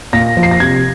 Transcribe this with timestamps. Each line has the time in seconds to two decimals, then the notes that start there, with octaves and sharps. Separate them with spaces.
0.13 A#2 A#6
0.37 F3
0.43 C7
0.51 A#6
0.60 C3 G#6